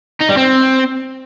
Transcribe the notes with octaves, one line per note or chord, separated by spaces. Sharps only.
D#4
G3
C4